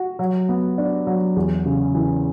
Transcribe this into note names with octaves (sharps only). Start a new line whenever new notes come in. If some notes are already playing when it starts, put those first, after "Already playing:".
Already playing: F#4
F#3
B3
D4
F#3
E2
C#3
E3